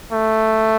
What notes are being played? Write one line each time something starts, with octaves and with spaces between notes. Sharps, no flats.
A3